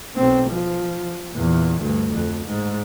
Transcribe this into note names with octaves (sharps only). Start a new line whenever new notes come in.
B1 C4
F3
E2 A#2
D2 G2
F2
G#2